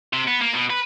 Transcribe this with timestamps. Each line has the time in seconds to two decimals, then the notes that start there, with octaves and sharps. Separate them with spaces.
0.13 C3
0.28 B3
0.41 A#3
0.54 B2
0.70 B4